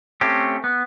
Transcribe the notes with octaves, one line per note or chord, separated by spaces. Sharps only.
A3 C4 C#4 G4
B3